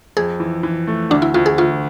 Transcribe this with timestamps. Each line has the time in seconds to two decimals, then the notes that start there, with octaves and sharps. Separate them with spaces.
0.17 F2 G#4
0.40 E3
0.63 E3
0.87 A3
1.10 D2 D4
1.22 E4
1.34 D2 F4
1.46 G#4
1.58 D2 F4